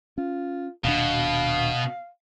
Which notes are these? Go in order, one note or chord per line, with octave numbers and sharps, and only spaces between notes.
C#4 F4
D#1 B2 D4 F5